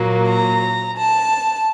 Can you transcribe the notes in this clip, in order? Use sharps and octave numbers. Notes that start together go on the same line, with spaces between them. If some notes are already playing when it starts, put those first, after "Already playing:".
Already playing: A#2 F#3 A#3
A#5
A5